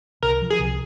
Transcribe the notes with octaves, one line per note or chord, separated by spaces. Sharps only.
C2 A#4
F3
G#4
C2